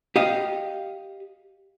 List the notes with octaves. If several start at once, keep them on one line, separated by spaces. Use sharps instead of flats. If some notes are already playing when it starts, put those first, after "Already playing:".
G4 D#5 F5